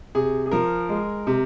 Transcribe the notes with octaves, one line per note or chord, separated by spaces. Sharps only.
C3 G#4
G#4
F3 A#4
G#3
C3